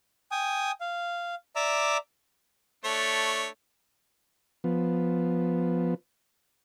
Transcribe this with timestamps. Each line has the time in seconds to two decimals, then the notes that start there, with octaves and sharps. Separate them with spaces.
0.31 G5 G#5 D#6
0.81 F5
1.56 D5 E5 A#5 D6 E6
2.85 A3 D4 C#5
4.64 F3 B3